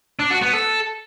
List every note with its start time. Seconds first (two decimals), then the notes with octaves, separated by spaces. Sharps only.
0.19 D4
0.31 F#4
0.42 B3
0.53 A4